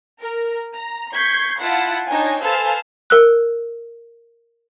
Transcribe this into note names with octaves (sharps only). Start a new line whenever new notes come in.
A#4
A#5
C#6 G6 G#6 B6 C7
E4 F4 F#5 A5
D4 D#4 C#5 G5 G#5
A4 B4 C5 F5 G#5 A5
A#4 E6 F#6